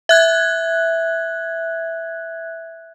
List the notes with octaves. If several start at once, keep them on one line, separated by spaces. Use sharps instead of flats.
E5 F#6 G#6